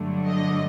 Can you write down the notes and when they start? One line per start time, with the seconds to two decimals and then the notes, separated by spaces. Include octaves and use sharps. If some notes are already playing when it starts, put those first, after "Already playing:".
Already playing: G2 D3 F#3 A3
0.25 D#5